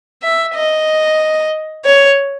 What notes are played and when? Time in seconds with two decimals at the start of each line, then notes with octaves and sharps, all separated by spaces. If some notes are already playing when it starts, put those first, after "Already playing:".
0.23 E5
0.55 D#5
1.85 C#5